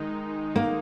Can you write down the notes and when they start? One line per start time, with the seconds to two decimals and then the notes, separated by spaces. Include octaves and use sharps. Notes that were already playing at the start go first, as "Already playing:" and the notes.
Already playing: D#3 G#3 D#4
0.56 A#3